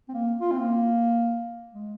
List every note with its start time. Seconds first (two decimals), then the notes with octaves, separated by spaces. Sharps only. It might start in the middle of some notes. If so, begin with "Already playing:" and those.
0.09 C4
0.14 A#3
0.41 F4
0.52 C4
0.59 A#3
1.73 G#3